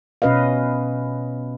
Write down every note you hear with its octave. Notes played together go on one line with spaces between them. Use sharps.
B2 C#4 B4 D#5 F5